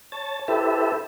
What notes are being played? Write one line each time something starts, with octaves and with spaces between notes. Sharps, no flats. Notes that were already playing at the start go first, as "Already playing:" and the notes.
C#5 A5
E4 G4 A4 B4 C5 E5